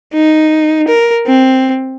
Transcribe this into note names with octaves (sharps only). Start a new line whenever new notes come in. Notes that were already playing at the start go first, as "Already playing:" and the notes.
D#4
A#4
C4